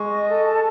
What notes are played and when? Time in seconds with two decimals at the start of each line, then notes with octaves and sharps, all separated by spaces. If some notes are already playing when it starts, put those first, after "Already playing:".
Already playing: G#3 C#6
0.10 D#5
0.28 A4
0.45 A5